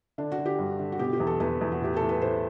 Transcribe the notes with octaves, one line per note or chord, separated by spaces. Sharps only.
D3 D4
F#4
D3
G4
G2
D3
F#4
B2 G4
G4
E2
A4
E2 B4
E2
F#4
A2 G4
A2 A4
B4
A2 C5